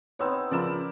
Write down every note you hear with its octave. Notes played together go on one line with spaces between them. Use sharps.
B3 C4 D#4 C#5 E6
C#3 F3 E4 A#4 D5 E7